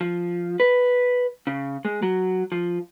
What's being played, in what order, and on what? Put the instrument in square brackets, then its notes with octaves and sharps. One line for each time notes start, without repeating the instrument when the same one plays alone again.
[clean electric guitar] F3
B4
C#3
G#3
F#3
F3